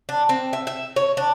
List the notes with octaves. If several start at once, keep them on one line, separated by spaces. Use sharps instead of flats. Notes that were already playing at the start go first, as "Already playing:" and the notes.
D4
C4
E5
E5
C#5
D4